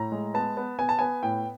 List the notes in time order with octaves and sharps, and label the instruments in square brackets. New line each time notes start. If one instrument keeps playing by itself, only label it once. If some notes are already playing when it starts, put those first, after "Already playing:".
Already playing: [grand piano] A2 A#5
G#3
B3 A5
B3
B3 G#5
A5
B3 G#5
A2 G5